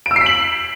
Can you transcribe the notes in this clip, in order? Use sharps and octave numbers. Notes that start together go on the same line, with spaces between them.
D7
E6
C7
B6
F#7